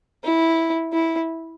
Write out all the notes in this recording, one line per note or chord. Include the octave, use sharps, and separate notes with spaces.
E4
E4